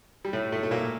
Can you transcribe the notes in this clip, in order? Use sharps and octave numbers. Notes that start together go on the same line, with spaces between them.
G3
A2 A3
A2 A3
A3
A#2 A#3